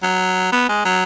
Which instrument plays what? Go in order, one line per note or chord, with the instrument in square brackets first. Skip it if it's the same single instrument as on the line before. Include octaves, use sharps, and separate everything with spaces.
[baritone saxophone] F#3
B3
G#3
F#3